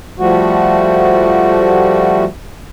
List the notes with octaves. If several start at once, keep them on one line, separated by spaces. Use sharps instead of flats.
F3 G3 A3 F#4